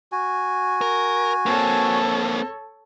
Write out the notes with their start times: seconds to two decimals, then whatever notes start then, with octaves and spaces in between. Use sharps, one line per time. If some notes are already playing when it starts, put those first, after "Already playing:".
0.12 F#4 G#5
0.81 A#4
1.46 A#3 C4 A4 C#5